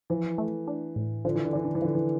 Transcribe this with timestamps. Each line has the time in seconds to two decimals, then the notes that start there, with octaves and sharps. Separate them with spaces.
0.10 E3 F3
0.38 A3
0.68 D4
0.96 A2
1.25 D3 F3
1.35 E3
1.45 D3
1.53 E3 D4
1.65 D3
1.75 E3
1.82 D3 F3
1.95 E3